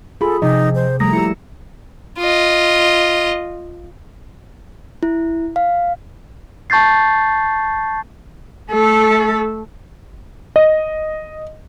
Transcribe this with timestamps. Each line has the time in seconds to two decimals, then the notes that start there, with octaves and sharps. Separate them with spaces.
0.21 F4 G#4 A4 B5
0.42 C3 F3 D#4 D#5
0.75 C5
1.00 F3 G3 A3 A#3 A#5 D#6 A#6
1.13 E4 G4 E6 A#6 C#7
2.19 F4 D#5
5.03 E4
5.56 F5
6.70 A5 C#6 G6 A6 C7
8.71 A3 A4
10.56 D#5